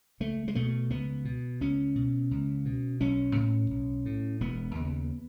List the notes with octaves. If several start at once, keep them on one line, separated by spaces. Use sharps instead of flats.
C#2 A3
G#3
B2 A3
C#2 B3
B2
C#2 C#4
B2
C#2
B2
B1 C#4
A2
B1
A2
E1 B3
D#2
C#3